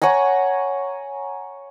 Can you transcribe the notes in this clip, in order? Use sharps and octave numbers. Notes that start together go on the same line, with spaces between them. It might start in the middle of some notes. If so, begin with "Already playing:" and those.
C#5 F#5 G#5 A#5